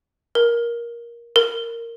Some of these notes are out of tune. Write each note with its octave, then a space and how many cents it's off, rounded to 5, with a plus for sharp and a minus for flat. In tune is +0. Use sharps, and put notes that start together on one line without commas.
A#4 +15
A#4 -10